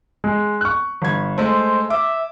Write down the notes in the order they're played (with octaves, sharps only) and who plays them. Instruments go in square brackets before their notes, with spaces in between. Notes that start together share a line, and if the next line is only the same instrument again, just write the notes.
[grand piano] G#3
C#6 F#6
[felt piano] G1 G#6
[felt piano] G#3 A3 [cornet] C5
[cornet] E5 [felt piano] D6